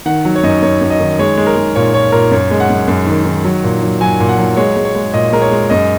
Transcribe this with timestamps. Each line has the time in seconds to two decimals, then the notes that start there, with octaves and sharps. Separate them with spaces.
0.06 D#3 F#5
0.25 F#3
0.35 C#5
0.43 F#2 D#5
0.62 F#2 C#5
0.81 F#2
0.90 D#5
1.00 D#3
1.19 G#3 C#5
1.37 G#3
1.46 A#4
1.56 G#3
1.75 A#2 C#5
1.94 A#2 C#5
2.12 A#2 A#4
2.31 F#2 C#5
2.51 G#3
2.60 F#5
2.70 F#2
2.88 F#2
3.07 D#3
3.25 D#3
3.44 F#3
3.64 A#2
3.82 F#3
4.01 F#3 G#5
4.20 A#2
4.29 F#5
4.38 F#3
4.57 G#3 C#5
4.76 G#3
4.85 C#5
4.95 G#3
5.14 A#2 D#5
5.33 G#3 A#4
5.42 C#5
5.51 G#3
5.70 F#2 D#5